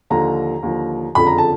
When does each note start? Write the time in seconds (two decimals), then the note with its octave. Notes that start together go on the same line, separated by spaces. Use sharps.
0.10 D#2 D3 F3 A#5
0.63 D#2 D3 F3
1.15 F#1 F2 D3 F3 B5
1.27 A#5
1.38 A5